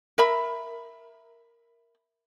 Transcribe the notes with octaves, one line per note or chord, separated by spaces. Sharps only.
A#4 E5 B5